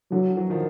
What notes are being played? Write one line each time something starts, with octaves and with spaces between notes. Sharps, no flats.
D3 E3 F#3
E3 F#3
D#3 F3